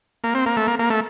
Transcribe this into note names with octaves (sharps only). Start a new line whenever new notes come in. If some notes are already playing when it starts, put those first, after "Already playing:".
A#3
C4
A#3
A3
A#3
A#3
A3